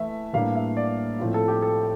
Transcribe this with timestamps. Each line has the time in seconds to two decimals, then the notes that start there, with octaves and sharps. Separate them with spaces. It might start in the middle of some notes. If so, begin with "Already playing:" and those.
Already playing: E3 A3 E4 E5
0.33 A2 E3 G3 A#3 D4 F5
0.55 E5
0.77 D5
1.19 A2 F3 C4 E4
1.34 A4
1.48 G4
1.62 A4